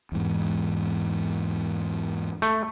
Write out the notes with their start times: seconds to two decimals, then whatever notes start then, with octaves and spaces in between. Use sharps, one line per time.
0.12 E2 G#2
2.42 A3